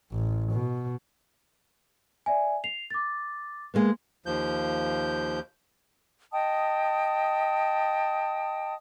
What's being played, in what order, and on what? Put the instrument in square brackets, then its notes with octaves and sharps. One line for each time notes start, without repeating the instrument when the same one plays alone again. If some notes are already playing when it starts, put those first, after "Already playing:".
[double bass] A1
B2
[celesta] D5 E5 G#5
C7 F7
D6 A6
[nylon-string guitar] G#3 A#3 B3
[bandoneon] D#2 F3 G6
[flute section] D#5 G5 A5 D#6